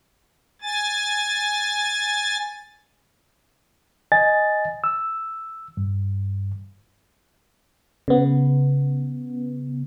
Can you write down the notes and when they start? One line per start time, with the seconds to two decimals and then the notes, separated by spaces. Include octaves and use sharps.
0.62 G#5 A6
4.12 D#5 G#5 A6
4.84 E6
5.77 G2
8.08 C#3 B3